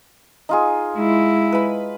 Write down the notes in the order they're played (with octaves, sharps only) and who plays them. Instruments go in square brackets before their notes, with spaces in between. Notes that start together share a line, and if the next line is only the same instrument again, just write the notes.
[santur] D#4 F4 G#4
[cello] G#3 E4
[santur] B4 B5